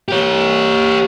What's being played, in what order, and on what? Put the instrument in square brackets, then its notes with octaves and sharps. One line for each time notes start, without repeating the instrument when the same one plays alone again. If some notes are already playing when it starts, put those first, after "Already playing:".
[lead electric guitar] G4 C#5